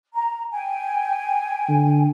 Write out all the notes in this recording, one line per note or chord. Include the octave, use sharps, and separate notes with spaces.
A#5
G5 G#5
D3